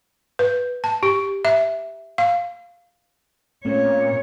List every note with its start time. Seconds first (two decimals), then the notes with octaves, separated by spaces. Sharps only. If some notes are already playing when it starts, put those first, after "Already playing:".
0.39 B4
0.84 A5
1.03 G4
1.45 E5
2.18 F5
3.65 A#2 A3 C4 C#4 C#5